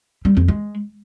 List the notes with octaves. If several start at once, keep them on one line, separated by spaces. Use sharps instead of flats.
G3
F2
G#3